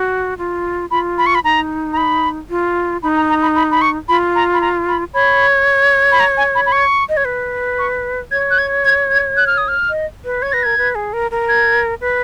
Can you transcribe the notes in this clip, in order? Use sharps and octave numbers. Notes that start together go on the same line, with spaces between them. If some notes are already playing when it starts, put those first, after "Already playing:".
Already playing: F#4
F4
F4 B5
B5
C#6
B5
D#4 A#5
A#5
B5
F4
D#4 B5
A#5
A#5
B5
B5
B5
C#6
F4 B5
A#5
B5
A#5
B5
C#5 B5
B5
A#5
G#5
B5
B5
C#6
D#5
C#5
B4
C#6
C#5 G#6
F#6
G#6
G#6
G#6
F#6
F6
D#6
F6
D#5
B4
C#5 G#6
B4 A#6
A#4 G#6
B4
G#4
A#4
A#4
G#6
B4